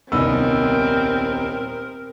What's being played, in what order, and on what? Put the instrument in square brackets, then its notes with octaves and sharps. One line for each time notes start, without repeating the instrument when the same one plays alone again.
[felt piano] D#1 C2 E6 [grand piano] B3 D#4 [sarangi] C4 [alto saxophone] A#4